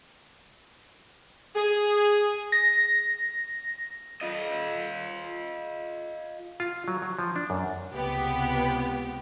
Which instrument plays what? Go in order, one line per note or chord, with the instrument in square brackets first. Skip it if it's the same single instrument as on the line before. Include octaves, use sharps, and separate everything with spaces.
[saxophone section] G#4
[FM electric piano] A#6
[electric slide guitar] F4 D#5
[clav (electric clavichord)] F4
F#3
F#3
F3
D4
F#2
[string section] C#2 C3 B3 G4